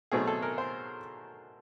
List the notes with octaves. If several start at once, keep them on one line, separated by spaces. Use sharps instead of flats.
B2 F#3 A3 C4 G#4
A4
A#4
C5